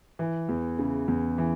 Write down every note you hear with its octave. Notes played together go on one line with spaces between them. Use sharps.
E3
E2
C#3
E2
E3